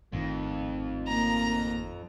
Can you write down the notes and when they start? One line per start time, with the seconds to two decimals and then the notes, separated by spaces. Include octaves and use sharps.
0.13 G#1 F2 A2 D#3
1.08 A#3 A#5